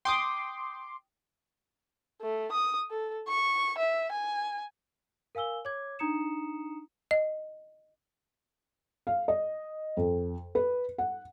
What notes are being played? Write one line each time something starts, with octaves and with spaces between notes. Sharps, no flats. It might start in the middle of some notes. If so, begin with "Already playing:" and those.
G5 C6 D6 D#6
A3
D#6
A4
C#6
E5
G#5
A#4 F5 G#5 E6 G7
C#5 D6 G#6
D4 D#4 A#5 D#6 C#7 E7
D#5
F5
D#5
F2
B4
F#5